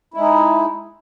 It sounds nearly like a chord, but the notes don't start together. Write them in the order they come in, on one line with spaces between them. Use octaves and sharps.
E4 G#3 D#4